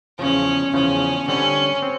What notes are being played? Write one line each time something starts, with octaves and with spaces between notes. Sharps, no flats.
E2 C#3 F3 C#4
E2 C#3 F3 C#4
D3 G3 C4 C#4
C4